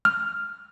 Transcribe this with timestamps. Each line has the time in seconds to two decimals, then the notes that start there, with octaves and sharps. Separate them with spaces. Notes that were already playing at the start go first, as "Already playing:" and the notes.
0.05 F6